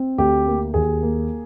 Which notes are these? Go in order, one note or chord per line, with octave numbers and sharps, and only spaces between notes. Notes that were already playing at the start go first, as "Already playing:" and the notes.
Already playing: C4
D2 G4
A#3
D#2 G#4
A#3